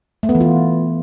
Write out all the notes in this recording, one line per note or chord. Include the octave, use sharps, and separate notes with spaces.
A3
B3
E3
F4